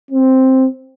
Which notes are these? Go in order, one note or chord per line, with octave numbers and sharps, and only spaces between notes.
C4